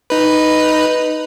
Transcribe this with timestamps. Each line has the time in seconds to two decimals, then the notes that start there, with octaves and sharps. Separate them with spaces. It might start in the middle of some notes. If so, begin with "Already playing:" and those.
0.10 D#4 B4